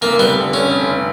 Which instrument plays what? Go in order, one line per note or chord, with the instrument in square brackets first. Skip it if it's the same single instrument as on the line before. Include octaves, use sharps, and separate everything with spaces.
[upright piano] F1 [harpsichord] A#3
[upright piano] G3 [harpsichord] B3
[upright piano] D3
[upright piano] D3 [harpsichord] C#4
[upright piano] F1
F1